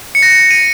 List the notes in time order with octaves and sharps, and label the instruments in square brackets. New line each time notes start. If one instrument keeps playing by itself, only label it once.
[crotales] C#7
A#6
C#7
D#7